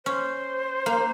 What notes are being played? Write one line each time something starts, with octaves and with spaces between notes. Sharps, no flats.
C#4 C5
A#3